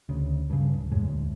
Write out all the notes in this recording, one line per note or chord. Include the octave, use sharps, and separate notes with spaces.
D2 C#3
G2 C#3
D1
F2 A2 G#3
D2